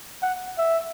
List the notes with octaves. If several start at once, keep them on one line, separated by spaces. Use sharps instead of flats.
F#5
E5